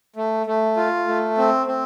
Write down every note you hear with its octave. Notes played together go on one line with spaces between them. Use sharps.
A3
A3
F4
A3
C4
C4